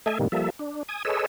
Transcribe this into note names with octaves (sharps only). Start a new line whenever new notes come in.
A3 A4 D#5 E5 G#5
A2 C3 D#3 G3 A#3
F3 G3 A#3 A4 E5
D4
G#5 D#6
G#4 A4 B4 C#5 D#5 E6